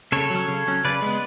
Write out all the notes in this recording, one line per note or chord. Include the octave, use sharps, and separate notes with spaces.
C#3 A4 C#5
F#3
C#4
C#3
F#3 C#4
C#3 B4 D5
G#3 B3